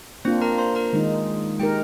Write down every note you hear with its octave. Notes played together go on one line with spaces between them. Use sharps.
A#3 C4 D4 F4 C5
A#4 A#5
C5 C6
A#4 A#5
D#3 G#3 D#4
G#3 D#4 G4 A#4 G5